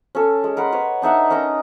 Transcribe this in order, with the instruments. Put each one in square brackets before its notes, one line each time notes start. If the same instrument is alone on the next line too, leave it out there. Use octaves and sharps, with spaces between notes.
[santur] C#4 A4
G#3
A#4 F#5 B5 C6
B4 C#5
D4 D#4 E5 F#5
C#4 A#4 D#5 A#5